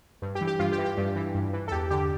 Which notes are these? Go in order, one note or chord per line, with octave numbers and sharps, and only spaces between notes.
G2
G4
E3
G4
G2 F4
G4
E3
G4
G2
E3
G2
E3
A4
E2 G4
D3 G4